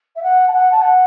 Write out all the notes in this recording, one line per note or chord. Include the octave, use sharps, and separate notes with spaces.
E5
F#5
A5
F#5
A5
F#5